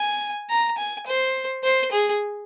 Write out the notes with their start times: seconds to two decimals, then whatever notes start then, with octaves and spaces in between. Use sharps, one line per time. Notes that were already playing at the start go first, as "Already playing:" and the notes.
Already playing: G#5
0.50 A#5
0.78 G#5
1.07 C5
1.63 C5
1.92 G#4